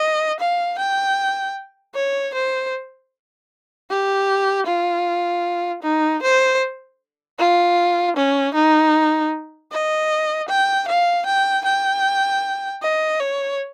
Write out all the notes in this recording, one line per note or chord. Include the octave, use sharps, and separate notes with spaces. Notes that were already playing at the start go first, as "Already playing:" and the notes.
Already playing: D#5
F5
G5
C#5
C5
G4
F4
D#4
C5
F4
C#4
D#4
D#5
G5
F5
G5
G5
D#5
C#5